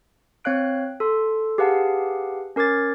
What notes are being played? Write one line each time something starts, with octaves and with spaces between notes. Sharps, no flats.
C4 C#5 F5 F#6 D7
A4 C6
G4 G#4 B4 F5 F#5 A5
C#4 A#4 D6 G#6 A6